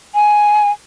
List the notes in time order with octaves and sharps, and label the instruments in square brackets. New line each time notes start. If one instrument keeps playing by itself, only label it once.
[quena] G#5